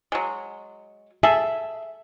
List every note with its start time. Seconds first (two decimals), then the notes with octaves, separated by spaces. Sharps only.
0.12 F#3 G#3
1.23 G#4 A4 E5